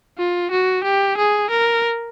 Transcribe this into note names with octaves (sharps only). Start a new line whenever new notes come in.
F4
F#4
G4
G#4
A#4